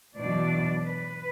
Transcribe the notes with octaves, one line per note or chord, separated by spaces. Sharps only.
E2 B2 F#3 D4 D5
B4